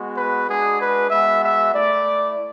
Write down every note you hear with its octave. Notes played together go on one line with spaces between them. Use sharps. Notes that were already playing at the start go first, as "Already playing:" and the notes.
Already playing: G#3 B3 F#4
B4
G#3 D4 F#4 G#4
B4
G#3 B3 F#4 E5
E5
A3 E4 D5